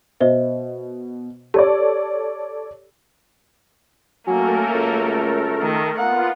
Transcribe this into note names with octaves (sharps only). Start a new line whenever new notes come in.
B2 C5 D#5 E5
G4 A4 C#5 D5
F#3 A3 A#3 C#4 A4 A#4
C#2 F#2
D#3
A#3 B3 F4 F#5